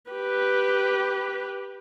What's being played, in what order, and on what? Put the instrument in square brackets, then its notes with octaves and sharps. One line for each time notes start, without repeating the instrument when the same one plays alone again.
[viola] G4 B4